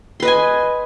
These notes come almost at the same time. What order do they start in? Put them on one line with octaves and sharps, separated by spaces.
C6 B4 D#5 G#5